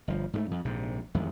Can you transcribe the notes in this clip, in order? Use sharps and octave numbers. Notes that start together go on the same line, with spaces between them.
G1 F3
G#2 G3 A3
F2
A#1 G#2 C3
A1 F2 D#3 G#3